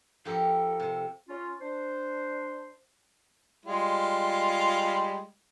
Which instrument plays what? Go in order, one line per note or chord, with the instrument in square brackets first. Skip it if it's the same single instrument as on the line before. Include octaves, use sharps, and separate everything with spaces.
[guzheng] F3 G4 A#4 [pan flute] A4
[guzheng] C3
[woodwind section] C#4 F4
D4 C5
[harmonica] G3 G#3 F4